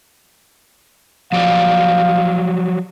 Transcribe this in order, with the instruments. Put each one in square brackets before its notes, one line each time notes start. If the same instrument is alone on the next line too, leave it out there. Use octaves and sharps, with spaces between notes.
[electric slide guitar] F3 F#3 D5 [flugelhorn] F5